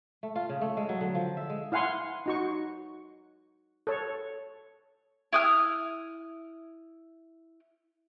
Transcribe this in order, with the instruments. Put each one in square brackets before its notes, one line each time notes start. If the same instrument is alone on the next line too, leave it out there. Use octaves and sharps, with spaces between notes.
[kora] A3
F4
C#3
A3
G#3
F#3
D3
F3
E5
G#3
[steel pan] E4 F5 F#5 G#5 C6
D#4 F#4 C#6
A4 C#5
[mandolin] E4 D#6 F6